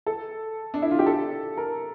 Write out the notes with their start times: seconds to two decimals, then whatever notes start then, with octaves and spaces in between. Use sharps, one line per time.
0.06 A4
0.74 D4
0.82 E4
0.91 F4
0.99 G4
1.07 A4
1.57 A#4